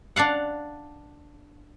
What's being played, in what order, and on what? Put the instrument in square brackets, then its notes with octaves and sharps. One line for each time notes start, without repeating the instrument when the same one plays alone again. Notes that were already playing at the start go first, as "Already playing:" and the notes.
[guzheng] D4 D5 F5 F#5